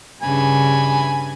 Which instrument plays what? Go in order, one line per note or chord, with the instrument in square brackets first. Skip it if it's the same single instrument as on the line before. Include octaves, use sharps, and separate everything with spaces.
[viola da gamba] G2 C#3 [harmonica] G#5 B5